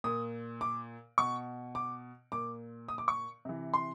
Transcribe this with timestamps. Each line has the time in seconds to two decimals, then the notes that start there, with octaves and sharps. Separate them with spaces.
0.04 A#2 D#6
0.61 D6
1.18 B2 C#6
1.75 D6
2.32 A#2 D6
2.88 D#6
2.98 D6
3.08 C#6
3.45 C3 E3
3.74 C6